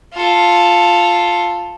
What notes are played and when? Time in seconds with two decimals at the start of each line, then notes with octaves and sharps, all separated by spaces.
0.13 F4 A4